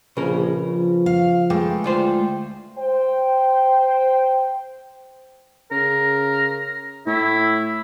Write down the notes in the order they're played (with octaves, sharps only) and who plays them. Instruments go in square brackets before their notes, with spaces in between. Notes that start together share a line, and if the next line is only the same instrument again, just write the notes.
[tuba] A#1 [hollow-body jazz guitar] C#3 A#4 [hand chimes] B4
[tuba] F3
[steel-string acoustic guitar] F5
[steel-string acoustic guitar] G#3 A3 [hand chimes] B4 G5 D6
[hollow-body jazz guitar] D2 F4 C5 [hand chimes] G5
[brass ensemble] C5 G5
[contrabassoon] C#3 [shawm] A#4
[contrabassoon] A2 [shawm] E4